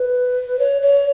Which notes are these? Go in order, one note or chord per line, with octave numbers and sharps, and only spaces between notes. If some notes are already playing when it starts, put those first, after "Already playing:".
Already playing: B4
C#5
C#5